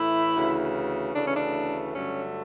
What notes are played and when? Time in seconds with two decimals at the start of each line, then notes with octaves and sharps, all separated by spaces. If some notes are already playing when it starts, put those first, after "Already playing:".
Already playing: A2 E3 A3 E4
0.36 D2 C#3 E3
1.15 D2 C#3 E3 A3 D4
1.25 C#4
1.36 D4
1.94 G2 D3 F#3 A3 C#4